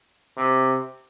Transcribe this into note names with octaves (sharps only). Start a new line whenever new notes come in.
C3